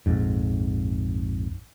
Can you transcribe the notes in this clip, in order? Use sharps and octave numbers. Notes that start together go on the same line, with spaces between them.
A#1 F2 G#2